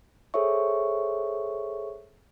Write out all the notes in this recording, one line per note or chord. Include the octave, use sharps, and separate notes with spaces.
G#4 A4 C5 C#5 E5 C#6